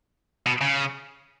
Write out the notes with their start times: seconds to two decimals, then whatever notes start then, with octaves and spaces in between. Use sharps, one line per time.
0.46 B2
0.61 C#3